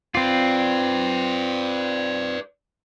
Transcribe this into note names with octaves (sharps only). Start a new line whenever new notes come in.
C4 F4 B4 D5